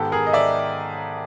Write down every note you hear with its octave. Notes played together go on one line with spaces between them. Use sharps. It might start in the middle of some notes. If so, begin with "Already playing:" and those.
Already playing: G#2 D#3 G#3 B3 G4 A4
G#4 A#4
D#5
D5 E5